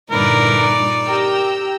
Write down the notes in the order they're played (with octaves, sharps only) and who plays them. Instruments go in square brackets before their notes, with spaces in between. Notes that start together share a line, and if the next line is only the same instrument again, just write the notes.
[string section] G2 A#2 D3 [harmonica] E3 A#4 B4 [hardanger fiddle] D#4 D5
[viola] G4 [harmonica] A#4 [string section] G5 A#5 E6